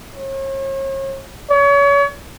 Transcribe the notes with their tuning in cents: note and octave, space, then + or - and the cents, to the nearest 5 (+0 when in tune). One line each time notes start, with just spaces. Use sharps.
C#5 -40
C#5 +35